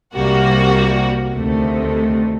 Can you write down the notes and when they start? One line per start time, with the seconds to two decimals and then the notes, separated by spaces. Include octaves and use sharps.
0.15 C2 C3 G3 A#3 F#4
1.34 D2 C3 D#3 A3